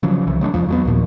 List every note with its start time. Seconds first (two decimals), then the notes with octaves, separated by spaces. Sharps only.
0.03 C#3 F3 F#3
0.27 C2 C#3 E3 F3
0.41 F#3 G#3 B3 D4
0.54 E2 F3
0.68 F#3 G3 B3
0.85 D#2 A#2 F3